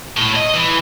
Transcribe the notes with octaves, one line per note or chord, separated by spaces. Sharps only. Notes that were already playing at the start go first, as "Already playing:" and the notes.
A2
D#5
E3